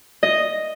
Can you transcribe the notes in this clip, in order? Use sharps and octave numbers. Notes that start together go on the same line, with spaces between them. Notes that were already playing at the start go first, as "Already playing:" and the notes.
D#5